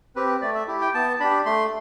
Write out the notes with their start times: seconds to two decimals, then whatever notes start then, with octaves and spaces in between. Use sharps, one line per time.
0.16 C4 G4 B4
0.42 A3 D5
0.55 E5
0.68 E4 G4
0.81 G5
0.94 B3 A5
1.20 D4 G4 B5
1.46 A3 C6